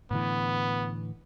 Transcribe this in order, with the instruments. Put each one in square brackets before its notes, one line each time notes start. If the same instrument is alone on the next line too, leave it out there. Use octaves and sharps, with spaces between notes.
[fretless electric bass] A2 D3 E3 [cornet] B3